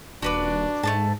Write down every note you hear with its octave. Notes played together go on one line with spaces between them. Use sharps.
D#1 D4 F#4 B4 D5
G#2 A3 A#3 A5